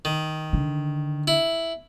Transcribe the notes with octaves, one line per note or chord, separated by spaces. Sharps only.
D#3
D3
E4